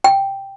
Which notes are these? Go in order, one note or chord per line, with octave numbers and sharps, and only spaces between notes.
G5